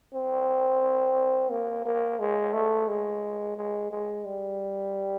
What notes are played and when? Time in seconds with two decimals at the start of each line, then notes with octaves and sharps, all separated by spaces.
0.14 C4
1.50 A#3
1.85 A#3
2.20 G#3
2.53 A3
2.88 G#3
3.57 G#3
3.91 G#3
4.25 G3